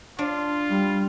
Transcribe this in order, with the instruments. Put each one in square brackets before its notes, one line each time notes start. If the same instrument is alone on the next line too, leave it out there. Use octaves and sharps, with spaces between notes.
[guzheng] D4 [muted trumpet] F4
[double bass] G3